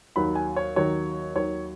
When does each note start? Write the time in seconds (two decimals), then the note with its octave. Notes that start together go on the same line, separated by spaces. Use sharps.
0.16 D#2 D#3 F#3 B5
0.35 G#5
0.56 C#5
0.76 D#2 D#3 F#3 C#5
1.35 D#2 D#3 F#3 C#5